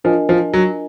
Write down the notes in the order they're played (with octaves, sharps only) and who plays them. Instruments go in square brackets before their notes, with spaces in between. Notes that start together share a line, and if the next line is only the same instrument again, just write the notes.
[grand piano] F3 [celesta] D4 F4 A#4 D#5 G#5
[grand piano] F3
F#3